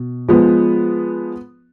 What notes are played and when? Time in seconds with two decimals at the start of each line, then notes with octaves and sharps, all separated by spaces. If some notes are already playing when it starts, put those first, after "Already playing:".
Already playing: B2
0.28 F3 G#3 B3